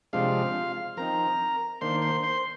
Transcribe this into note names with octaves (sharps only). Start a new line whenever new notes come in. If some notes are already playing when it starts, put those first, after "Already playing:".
C3 F3 G#3 D4 F4 F5
F3 C4 D#4 A#4 A#5
D#3 A#3 D4 C5 C6
C5 C6
C5 C6